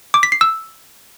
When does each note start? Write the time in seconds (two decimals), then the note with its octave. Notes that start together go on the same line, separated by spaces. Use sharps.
0.14 D6
0.23 B6
0.32 C7
0.41 E6